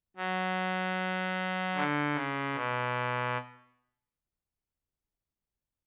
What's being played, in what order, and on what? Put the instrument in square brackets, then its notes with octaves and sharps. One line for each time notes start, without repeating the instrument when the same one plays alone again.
[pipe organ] F#3
D3
C#3
B2